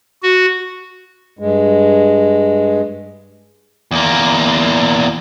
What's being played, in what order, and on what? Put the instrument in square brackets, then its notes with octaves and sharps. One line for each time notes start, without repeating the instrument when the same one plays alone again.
[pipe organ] F#4
[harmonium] G2 G#3
[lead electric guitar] E2 A#3